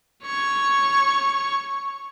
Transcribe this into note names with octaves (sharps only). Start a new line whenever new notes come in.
C#5 C#6